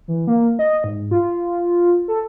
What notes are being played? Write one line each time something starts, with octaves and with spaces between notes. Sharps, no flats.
E3
A#3
D#5
G#2
F4
A4